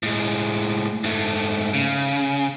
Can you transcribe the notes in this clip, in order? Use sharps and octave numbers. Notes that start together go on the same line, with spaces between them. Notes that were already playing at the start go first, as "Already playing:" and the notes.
A2 G#3
G#2 A3
C#3